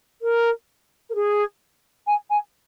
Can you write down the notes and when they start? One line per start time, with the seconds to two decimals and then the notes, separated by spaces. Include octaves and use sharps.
0.21 A#4
1.09 A#4
1.14 G#4
2.06 G#5
2.30 G#5